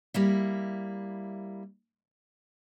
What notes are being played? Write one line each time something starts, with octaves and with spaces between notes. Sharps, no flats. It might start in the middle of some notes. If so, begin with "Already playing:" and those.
G3 A#3 E4